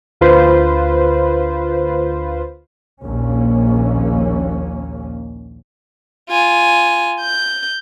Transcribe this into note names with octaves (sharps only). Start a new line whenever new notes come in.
D2 F4 B4 C5
A#1 D#2 A#3 C#4
F4 G#5
G6